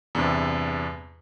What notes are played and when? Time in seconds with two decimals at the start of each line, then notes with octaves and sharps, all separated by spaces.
0.15 E2 G2 C3